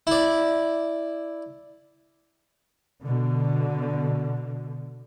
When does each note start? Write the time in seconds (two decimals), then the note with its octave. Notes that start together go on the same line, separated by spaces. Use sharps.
0.07 E4 D5
3.02 B2 D3